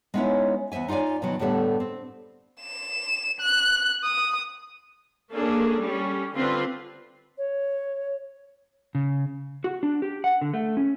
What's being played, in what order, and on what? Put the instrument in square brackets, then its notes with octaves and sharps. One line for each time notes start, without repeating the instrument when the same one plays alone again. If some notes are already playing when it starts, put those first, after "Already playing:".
[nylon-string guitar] G#3 B3 C#4 D#4 E4 C#5
E2 B3 C5 E5 G#5
D#4 F4 C#5 D5 G#5
B2 D#3 F3 F#3
A2 D3 G3 A3 B3
C4
[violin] E7
F#6
D#6
[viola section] A#3 C#4 D4 G#4 A4
G3 C#4
D3 C4 F4 B4 C6
[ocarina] C#5
[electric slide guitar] C#3
F#4
D4
G4
F#5
D3
A3
C#4